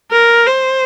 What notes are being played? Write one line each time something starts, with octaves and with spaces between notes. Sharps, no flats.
A#4
C5